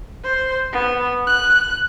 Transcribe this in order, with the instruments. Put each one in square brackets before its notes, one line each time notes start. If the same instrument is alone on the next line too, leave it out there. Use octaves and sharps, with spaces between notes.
[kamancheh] C5
B3
F#6